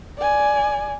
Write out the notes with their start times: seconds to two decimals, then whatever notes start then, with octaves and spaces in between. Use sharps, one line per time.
0.18 D5 G#5